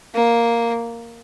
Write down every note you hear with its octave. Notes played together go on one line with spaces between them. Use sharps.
A#3